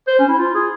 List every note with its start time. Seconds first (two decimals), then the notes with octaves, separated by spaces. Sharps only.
0.07 C5
0.19 C#4
0.28 E4
0.39 F4
0.55 G#4